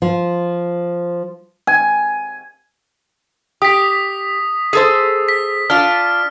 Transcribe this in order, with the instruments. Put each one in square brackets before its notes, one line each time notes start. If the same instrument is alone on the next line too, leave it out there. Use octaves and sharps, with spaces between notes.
[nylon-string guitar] F3
[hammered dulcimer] G#5
[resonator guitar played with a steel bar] G4 [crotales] D#6 B6
[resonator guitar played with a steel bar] G#4 A4 C5
[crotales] B6
[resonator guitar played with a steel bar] D4 F4 [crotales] F6